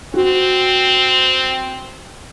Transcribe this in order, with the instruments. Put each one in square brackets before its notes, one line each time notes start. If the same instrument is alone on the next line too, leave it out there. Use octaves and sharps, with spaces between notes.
[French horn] C4 [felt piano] F#4